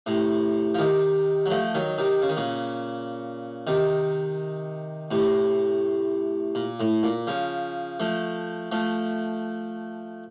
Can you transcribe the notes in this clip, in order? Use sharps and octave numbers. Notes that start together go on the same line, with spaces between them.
A2 C3
F3
C3 D#3
F#3
F3 A3
D#3 F#3
C3 D#3
C#3
D#3
A#2 C#3
C3 D#3
A2 C3
A#2
A2
A#2
C#3 F3
F3 A3
F3 A3